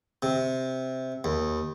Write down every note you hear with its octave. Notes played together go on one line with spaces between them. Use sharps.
C3
D#2